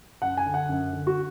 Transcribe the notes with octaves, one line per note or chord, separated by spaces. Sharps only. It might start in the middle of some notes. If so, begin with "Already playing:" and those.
F#2 F#5
G#5
D3
F#5
F#2
D3
F#4